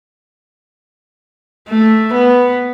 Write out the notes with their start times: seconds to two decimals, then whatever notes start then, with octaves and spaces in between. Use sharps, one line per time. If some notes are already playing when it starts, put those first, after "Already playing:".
1.69 A3
2.13 B3